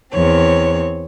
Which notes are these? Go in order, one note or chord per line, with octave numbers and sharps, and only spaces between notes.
E2 C4 C#5